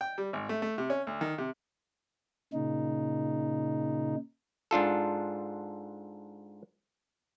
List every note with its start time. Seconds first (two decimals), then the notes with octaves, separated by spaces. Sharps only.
0.01 G5
0.18 G3
0.33 G#1
0.49 A3
0.62 A3
0.78 C3
0.90 C#4
1.07 D2
1.21 D#3
1.38 C3
2.53 A#2 C#3 D#4
4.71 G#2 D4 F4 A4